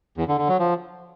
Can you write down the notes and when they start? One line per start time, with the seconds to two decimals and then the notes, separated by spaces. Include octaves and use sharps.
0.17 E2
0.28 D3
0.38 D3
0.49 F#3
0.59 F3